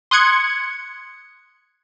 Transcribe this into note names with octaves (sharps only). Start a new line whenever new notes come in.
C6 D#6 F#6 G#6 C#7